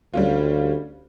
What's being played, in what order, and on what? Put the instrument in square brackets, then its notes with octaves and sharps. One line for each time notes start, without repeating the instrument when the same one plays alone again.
[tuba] D2 [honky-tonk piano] G3 C#4 F4